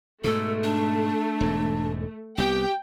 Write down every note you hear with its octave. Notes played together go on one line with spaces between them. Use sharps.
G#2 B2 A3 A4
D4
E1 G#2
C2 B3 G4 G5